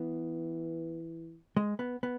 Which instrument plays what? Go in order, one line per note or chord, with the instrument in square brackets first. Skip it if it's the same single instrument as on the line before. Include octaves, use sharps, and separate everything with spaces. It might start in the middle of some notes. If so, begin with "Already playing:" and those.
Already playing: [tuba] E3 [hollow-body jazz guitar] B3
[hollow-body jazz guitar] G#3
B3
B3